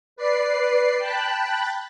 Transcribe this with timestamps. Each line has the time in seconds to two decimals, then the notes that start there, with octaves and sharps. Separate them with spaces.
0.16 B4 D5 C7
0.98 G5 A5 B5 F#6